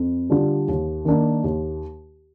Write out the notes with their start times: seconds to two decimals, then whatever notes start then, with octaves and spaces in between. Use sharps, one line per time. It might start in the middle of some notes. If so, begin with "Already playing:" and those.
Already playing: F2
0.30 D3 G3 D4 F4
0.68 D#2
1.05 D#3 A#3 D4
1.44 D#2